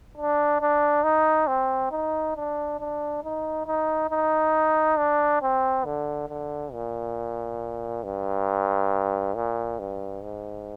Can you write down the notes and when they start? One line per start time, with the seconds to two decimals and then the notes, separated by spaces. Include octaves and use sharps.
0.17 D4
0.61 D4
1.04 D#4
1.47 C4
1.91 D#4
2.36 D4
2.80 D4
3.23 D#4
3.66 D#4
4.10 D#4
4.98 D4
5.42 C4
5.85 D3
6.29 D3
6.73 A#2
8.04 G2
9.35 A#2
9.79 G2
10.23 G#2